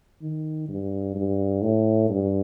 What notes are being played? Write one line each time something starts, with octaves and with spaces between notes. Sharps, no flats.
D#3
G2
G2
A2
G2